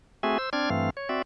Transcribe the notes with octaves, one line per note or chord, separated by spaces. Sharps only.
A3 C4 F#4 G#4 E5 G#5
C5 E6
C4 D4 D5 F6 G#6
G2 E3 A3 C4 F5
C#5
C4 F#4 D5 E5